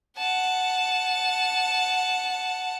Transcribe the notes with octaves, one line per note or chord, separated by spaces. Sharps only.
F#5 A5